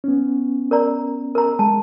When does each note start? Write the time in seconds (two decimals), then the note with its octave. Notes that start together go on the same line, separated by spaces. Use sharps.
0.04 B3 C#4
0.71 A#4 D5 A#5
1.35 A#4 A#5
1.59 G#3 A5